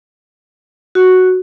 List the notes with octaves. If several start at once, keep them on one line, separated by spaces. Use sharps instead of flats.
F#4